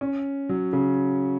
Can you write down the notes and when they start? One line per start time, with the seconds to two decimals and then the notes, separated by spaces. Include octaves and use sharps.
0.01 C#4
0.49 F#3
0.73 C#3